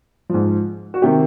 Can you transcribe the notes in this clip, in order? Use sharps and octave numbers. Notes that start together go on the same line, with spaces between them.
G#2 F3
F#4
C3 D#3 G4